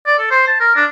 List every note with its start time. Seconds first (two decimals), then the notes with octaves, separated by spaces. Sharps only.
0.06 D5
0.19 A4
0.31 C5
0.48 A5
0.60 A#4
0.76 D4